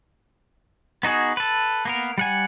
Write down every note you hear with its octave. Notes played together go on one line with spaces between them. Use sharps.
B3 D#4 F#4 G#4
A4 B4
A#3 B3 A#4
G3 F#5 G#5